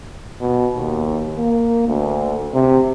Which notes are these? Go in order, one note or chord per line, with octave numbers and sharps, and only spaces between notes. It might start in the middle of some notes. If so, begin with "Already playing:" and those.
B2
D#2
A#3
D2
C3